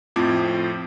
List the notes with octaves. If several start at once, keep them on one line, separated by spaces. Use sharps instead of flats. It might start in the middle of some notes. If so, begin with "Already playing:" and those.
F2 A2 F3 C4 D6 G#6